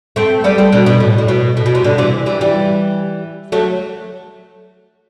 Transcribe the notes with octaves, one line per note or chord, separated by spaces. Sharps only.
A3 C4
G3 B3
A3 C4
B2 D3
B2
A2
A2
B2
A2
B2
C3
B2 D3
C3 E3
E3 G3
E3 G3
F#3 A3